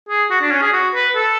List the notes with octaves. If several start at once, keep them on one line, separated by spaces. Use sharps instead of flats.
G#4
F#4
D4
C#4
G#4
F#4
B4
A4